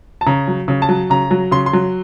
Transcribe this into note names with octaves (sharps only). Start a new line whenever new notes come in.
A5
C#3 A#5
F#3
C#3
A5
F#3
C#3 A#5
F#3
C#3 C6
C6
F#3